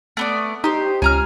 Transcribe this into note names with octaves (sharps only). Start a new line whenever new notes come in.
A3 B3 D5
D#4 G4 C5
C#2 G#5 A#5 F6